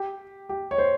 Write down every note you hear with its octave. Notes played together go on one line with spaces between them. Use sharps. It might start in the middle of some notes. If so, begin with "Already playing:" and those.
Already playing: G4
G4
C#5
C5